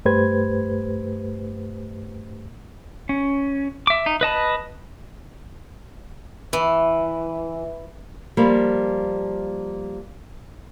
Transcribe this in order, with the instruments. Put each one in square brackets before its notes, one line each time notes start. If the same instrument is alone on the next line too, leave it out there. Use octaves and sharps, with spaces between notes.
[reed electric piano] G2 A3 G4 B4 C5 G#6
[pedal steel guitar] C#4
E5 D6
D#4
B4 D#5 A5 B5
[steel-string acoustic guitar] E3
[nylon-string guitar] F3 G3 A#3